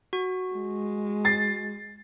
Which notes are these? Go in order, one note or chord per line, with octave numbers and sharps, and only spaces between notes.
F#4
G#3
A6 C7